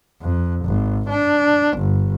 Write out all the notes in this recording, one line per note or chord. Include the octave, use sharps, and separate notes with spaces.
F2
G#1
D4
G1